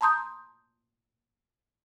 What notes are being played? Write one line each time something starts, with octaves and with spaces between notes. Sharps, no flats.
A5 A#5 C6 D#6 G6